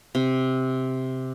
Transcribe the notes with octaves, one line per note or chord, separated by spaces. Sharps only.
C3